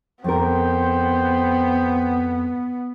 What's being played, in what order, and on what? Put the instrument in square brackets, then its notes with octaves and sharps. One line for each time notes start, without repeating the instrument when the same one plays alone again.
[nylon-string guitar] F2 A#4 [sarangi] B3 [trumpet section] C5 G5